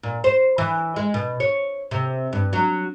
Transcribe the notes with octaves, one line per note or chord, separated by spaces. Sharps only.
A#2
C5
E3
G#3
B2
C#5
C3
G2
F#3